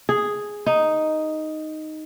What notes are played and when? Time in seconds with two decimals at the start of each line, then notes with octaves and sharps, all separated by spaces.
0.09 G#4
0.66 D#4